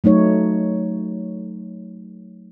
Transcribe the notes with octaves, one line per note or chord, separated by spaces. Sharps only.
F#3 A3 D#4 C#5